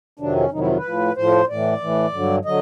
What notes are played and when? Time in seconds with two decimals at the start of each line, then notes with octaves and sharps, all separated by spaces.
0.19 F2 C3 D#3 F#3 D4
0.36 C#4
0.51 F2 C3 D#3 F#3 D#4
0.59 E4
0.68 F4
0.76 B4
0.85 A2 F3
1.16 A2 F3 C5
1.49 A2 E3 D5
1.80 A2 E3
2.13 G2 D3 F#3
2.45 D3 F#3 D#5